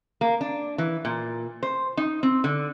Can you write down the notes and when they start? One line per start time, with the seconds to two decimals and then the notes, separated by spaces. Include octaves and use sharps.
0.21 A#3
0.41 D4
0.78 E3
1.05 A#2
1.63 C5
1.97 D#4
2.23 C4
2.44 D3